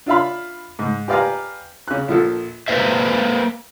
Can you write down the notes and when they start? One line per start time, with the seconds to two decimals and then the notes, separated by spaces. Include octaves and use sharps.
0.06 D4 F4 E5 F5 B5
0.79 G#2
1.08 G4 B4 D5 F5 G#5 A#5
1.88 C#3 F#6
2.08 A#1 F3 A4
2.68 A#3 B4 C5 E5